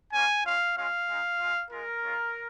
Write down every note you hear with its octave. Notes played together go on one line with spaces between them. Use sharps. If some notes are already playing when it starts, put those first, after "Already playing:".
A#3 C#4 F4 G#5
G#3 C#4 F4 F5
G#3 C#4 F4 F5
G#3 D#4
G#3 F4
G#3 F4 A#4
G#3 C#4 F4